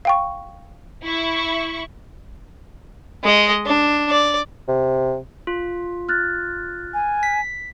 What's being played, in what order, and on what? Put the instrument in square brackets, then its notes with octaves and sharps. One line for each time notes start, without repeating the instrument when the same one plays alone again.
[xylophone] F5 G5 C#6
[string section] E4 C#6
[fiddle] G#3 D#5
D4
D5
[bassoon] C3
[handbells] F4
[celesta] F6 F#6 A6
[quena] G#5
[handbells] B6